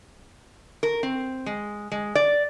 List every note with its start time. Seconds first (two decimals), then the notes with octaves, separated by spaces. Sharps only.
0.83 A#4
1.03 C4
1.46 G#3
1.92 G#3
2.15 D5